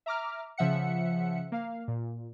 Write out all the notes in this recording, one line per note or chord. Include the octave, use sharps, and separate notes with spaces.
E5 A#5 D6 F6
C#3 F3 E5 F#5 C#7
A#3 F5
A#2